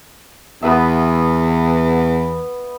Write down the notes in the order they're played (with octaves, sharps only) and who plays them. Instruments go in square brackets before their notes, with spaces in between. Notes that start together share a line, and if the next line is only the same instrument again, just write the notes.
[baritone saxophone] E2 [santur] B3 B4 E5